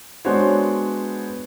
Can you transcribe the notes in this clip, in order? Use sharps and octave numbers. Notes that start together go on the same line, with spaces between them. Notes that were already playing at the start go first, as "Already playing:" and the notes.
G#3 B3 D4 F#4 C5 C#5